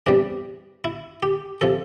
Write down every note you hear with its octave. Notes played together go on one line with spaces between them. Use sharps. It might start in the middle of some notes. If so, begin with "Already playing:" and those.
E2 C3 G3 D4
E4
G4
C3 F3 A4